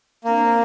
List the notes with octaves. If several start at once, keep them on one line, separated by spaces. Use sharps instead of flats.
A#3 C4 D4